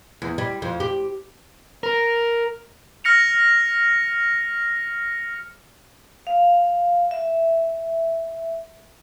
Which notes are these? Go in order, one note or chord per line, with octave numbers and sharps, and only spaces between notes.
E2
G3
F2
G4
A#4
F6 A#6 C#7 F7
F5
E5